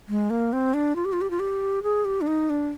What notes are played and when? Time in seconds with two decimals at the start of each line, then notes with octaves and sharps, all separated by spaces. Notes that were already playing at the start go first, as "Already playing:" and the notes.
0.09 G#3
0.30 A#3
0.53 C4
0.74 D4
0.96 F4
1.05 G4
1.13 F4
1.21 G4
1.31 F4
1.39 G4
1.83 G#4
2.05 G4
2.21 D4
2.27 D#4
2.50 D4